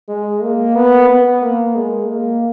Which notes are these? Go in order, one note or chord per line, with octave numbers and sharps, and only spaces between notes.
G#3
A#3
B3
B3
A#3
G#3
A#3